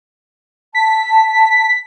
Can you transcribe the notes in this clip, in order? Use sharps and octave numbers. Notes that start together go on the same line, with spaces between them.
A5 B6